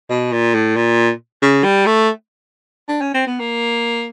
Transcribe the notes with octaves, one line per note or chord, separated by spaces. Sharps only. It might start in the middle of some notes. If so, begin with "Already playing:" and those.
B2
A#2
A2
A#2
C#3
G3
A3
D4
C#4
C4
B3
A#3